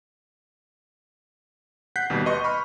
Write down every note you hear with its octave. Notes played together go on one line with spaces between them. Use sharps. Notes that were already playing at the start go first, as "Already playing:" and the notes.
F#5 F#6 G6 B6 C7
D#2 B2 G3
B4 D#5 C6 C#6
B5 C#6 F6